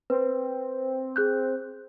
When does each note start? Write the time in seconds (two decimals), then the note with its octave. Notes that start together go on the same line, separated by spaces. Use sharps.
0.10 C4 B4
1.16 G#4 F#6 G6